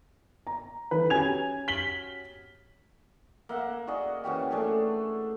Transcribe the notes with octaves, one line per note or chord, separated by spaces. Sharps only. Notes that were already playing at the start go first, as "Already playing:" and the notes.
A#5
D#3 E3 A4 B4
C#4 F#4 G4 G#5 G#6 F7
B6 F#7 G7
A#3 E5 F#5
F#4 G#4 D5 D#5
C#3 E3 F#4 G4
A3 D4 G#4